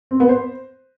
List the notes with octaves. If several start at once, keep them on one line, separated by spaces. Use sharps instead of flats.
C4
B3
C5